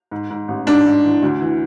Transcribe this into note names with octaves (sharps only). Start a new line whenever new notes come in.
G#2
G#2
A1
G#2 D4
G#2
E3
D2
E3